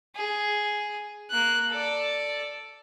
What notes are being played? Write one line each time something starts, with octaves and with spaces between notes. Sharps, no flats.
G#4
A#3 F#6
A4 D5